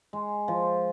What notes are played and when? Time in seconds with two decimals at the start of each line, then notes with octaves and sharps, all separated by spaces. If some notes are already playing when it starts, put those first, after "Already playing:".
0.13 G#3
0.48 F3